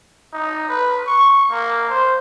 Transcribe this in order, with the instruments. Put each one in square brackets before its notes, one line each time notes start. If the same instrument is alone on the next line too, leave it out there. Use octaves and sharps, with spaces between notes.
[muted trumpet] D#4
B4
C#6
A#3
C5